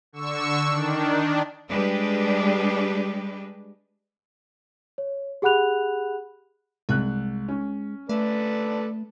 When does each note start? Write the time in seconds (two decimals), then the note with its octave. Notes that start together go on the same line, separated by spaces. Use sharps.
0.13 D3 C#6 E6
0.65 D#3 D4
1.70 G3 G#3 D4 G4 B4
4.98 C#5
5.42 G4 G#4 F#5 B5 F#6 F7
6.89 C2 G#3 F#6
7.48 C#4
8.09 A3 A4 B4 D5